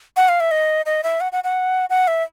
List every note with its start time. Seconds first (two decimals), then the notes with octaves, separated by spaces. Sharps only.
0.17 F#5
0.29 F5
0.40 E5
0.51 D#5
0.86 D#5
1.03 E5
1.21 F#5
1.32 F#5
1.44 F#5
1.90 F#5
2.08 E5